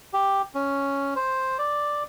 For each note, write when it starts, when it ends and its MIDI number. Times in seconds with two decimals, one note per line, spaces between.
0.14 0.42 67
0.55 1.14 61
1.16 1.58 72
1.58 2.03 74